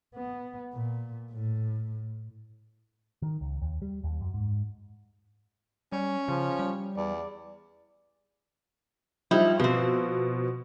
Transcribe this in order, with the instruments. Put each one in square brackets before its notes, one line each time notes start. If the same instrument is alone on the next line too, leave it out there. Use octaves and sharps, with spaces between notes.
[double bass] B3
A#2
A2
[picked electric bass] D#3
C#2
D#2
G3
D#2
F#2
G#2
[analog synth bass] G3 [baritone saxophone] C#4
[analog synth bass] C#3 [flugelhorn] F3
[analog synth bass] G3
[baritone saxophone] E2 [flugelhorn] D5
[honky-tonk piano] F3 G3 [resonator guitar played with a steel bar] D#4 E4
[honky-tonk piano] B2 [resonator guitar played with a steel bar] F3 C4